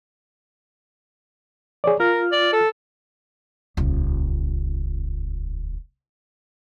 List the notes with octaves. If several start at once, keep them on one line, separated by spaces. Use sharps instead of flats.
G#4 C#5 D5
F4 A#4 F6
D5
A4
D#1 C#2